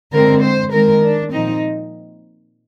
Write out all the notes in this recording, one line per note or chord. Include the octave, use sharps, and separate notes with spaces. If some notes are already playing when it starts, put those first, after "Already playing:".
D3 G#3 C4 A#4
C5
D#3 G#3 C4 A#4
D4
A#2 F3 C4 D#4